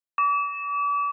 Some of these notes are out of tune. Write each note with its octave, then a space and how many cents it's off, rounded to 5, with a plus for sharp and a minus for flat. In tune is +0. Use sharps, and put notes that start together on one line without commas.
D6 -40